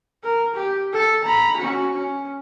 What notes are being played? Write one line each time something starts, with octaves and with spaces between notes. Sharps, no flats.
A#4
G4
A4
A#5 B5
C#4 F#4
C#4